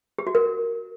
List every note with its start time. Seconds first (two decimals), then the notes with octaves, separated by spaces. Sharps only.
0.19 G4
0.27 F#4
0.35 A#4